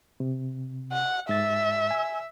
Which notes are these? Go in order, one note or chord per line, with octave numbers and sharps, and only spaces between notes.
C3
F#5
G#2 E5 A6
G#5 E6